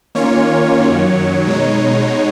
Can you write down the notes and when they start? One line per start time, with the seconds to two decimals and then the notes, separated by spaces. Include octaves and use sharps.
0.15 D#3 A#3 C#4 F4 C#5
0.80 F#2 D#3 F#3
1.47 B2 G#3 D#4